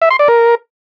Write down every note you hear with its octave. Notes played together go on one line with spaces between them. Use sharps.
E5
C6
D5
A#4